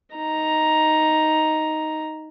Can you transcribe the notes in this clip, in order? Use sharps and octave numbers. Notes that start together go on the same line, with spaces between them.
D#4 A#5